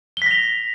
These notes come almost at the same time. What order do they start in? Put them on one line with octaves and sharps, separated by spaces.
G7 B6 A#6 F7